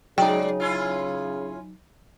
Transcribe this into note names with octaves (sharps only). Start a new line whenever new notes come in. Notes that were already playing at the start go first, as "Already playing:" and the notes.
C#3 F#3 G#3 D#4 D5 G5
C#4 E4 F4